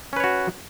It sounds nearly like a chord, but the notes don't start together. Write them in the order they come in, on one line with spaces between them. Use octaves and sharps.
C#4 B4 C#5 F#4